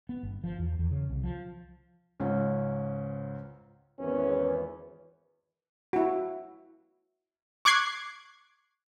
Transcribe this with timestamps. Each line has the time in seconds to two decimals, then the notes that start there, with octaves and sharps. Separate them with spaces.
0.09 B3
0.23 G1
0.44 F3
0.59 E2
0.79 E2
0.91 C#3
1.10 C2
1.24 F3
2.20 C#2 G#2 C#4
3.99 G#1 E2 C#4 B4
5.93 E4 F#4
7.65 C#6 D6 F#6 G#6 C7